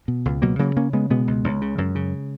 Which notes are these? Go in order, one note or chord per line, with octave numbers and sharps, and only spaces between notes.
B2
C#2
B2 F#3 A#3
C#3 F#3 A#3
C#3 A#3 C#4
C#3 G#3 B3
B2 G#3 B3
C#2
C#2
C#3
F#2
C#3